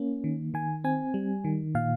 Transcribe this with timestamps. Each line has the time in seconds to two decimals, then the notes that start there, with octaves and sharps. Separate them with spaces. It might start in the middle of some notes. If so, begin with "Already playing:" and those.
Already playing: A#3 C#4
0.24 D#3
0.54 D#3 G#5
0.84 C4 G#5
1.14 G3
1.44 D#3
1.75 A#2 F5